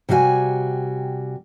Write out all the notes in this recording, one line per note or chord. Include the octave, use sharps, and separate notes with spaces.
C3 G3 F#4 E5 G#5